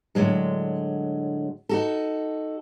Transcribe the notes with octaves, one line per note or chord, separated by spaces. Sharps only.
A2 D3 F#3 G#3
D#4 F#4 A4